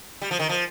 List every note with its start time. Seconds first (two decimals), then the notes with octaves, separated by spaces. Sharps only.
0.22 G3
0.31 F3
0.39 D#3
0.49 F3